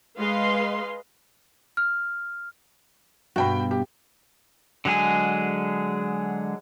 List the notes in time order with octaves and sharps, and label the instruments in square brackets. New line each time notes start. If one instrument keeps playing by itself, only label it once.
[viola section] G#3 B4 D#5 F5 C6
[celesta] F6
[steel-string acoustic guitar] G2 B2 [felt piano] F#4 G5 B5
[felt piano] G4
[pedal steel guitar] D3 F#3 G#3 G#4